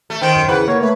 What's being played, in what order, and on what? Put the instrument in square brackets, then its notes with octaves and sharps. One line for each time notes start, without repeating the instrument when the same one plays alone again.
[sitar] A3
[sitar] D#3 [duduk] C5 [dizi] G5
[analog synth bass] F#2
[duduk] C#3 [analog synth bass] E3 [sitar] B4 [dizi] F#5
[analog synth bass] A#3 [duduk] C#5
[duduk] A3 [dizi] B4